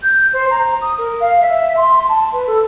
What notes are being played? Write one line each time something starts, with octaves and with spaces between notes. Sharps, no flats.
G6
C5
A#5
D#6
A#4
F5
E5
C6
C6
A5
B4
A4